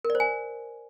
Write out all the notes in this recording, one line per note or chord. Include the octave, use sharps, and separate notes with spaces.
A#4
D5
C5
G#5